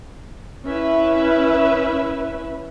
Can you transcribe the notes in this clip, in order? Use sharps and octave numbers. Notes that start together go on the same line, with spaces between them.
C#4 E4 B4 E5